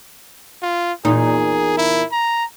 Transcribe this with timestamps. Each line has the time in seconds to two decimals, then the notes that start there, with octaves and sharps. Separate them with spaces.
0.62 F4
1.05 E2 A#2 D#4 G#4
1.78 E4
2.12 A#5